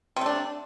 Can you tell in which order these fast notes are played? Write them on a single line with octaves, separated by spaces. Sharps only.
C3 A3 D4